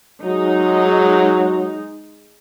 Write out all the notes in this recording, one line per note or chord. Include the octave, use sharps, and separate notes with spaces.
F#3 G#3 D#4